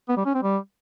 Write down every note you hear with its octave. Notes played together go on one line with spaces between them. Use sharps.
B3
G3
C#4
C4
G3